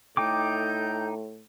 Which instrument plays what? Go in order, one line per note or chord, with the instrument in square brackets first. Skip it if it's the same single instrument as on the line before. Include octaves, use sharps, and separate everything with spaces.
[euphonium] A2 [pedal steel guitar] D#4 G5 D6 [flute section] A4 G6